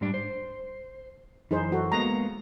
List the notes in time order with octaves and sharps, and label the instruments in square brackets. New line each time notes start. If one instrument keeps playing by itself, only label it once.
[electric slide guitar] G#2 G3 D4
C5
[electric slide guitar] F#2 E3 [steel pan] D#4 G#4 C5
[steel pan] F#4 A4
[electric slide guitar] G#3 A#3 B3 [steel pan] A#5